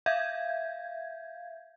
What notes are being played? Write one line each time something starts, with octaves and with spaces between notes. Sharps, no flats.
E5 F5 G6 G#6